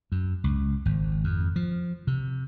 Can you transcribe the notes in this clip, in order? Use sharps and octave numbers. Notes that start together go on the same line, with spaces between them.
F#2
C#2
G#1
F2
F3
C3